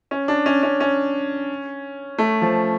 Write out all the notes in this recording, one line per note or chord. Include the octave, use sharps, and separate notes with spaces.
C#4
D4
C#4
C#4
C#4
A3
F3